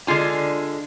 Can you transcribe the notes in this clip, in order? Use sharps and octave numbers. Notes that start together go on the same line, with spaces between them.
D3 G#3 F4 G#5